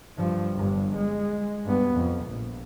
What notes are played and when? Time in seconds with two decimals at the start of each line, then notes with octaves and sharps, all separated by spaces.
0.17 G2 F3
0.54 G1 G2
0.95 G#3
1.65 G2 B3
1.95 F2
2.25 A#1